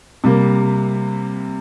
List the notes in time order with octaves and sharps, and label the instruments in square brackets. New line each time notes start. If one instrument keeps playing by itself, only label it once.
[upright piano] C3 G3 A#3